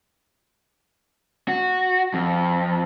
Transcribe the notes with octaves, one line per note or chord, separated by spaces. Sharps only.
F#4
F2